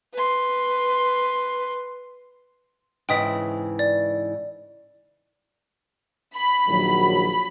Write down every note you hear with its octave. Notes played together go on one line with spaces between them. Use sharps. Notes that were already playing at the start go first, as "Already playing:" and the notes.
B4 C6
G#2 C#3 E3 G5 D#6 B6
D5
B5
A#1 D#3 F#3